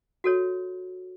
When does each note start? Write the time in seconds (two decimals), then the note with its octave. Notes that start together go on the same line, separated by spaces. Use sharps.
0.24 F#4 A4 C#5